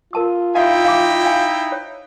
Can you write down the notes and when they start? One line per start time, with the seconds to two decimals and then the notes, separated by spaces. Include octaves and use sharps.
0.13 F4 A#4 A5 D#6
0.55 D#4 E4 G4 E5 F5 G5
0.85 F5 G#5 D6
1.24 F5 G#5
1.72 C#5